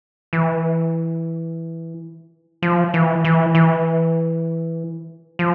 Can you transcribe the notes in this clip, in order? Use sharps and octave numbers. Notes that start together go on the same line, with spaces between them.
E3
F3
E3
E3
E3
F3